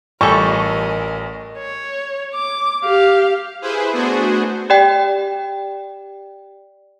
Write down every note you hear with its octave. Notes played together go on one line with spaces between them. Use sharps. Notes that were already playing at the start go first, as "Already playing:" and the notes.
A1 G3 F4 A4 A#4 D#5 G#5 C#6
C#5
D6
G4 F5
E4 G#4 B4 C5
A3 B3 D4 F#4 G#4 C5
G4 D5 G5